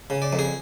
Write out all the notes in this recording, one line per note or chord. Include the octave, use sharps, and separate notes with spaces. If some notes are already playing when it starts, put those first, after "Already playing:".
C#3
D5
F2
G#4